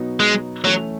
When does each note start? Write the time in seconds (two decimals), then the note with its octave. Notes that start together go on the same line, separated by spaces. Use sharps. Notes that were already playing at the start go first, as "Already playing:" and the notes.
Already playing: B2 F#3 B3 D#4 F#4
0.20 G#3
0.64 E3 F#3 A3 C#4